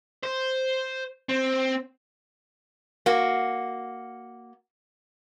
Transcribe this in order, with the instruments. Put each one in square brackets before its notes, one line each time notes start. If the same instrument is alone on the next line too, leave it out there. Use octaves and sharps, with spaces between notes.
[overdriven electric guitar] C5
C4
[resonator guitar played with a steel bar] A#3 F#4